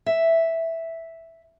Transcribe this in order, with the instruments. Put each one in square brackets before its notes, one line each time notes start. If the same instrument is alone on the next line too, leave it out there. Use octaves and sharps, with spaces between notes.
[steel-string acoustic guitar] E5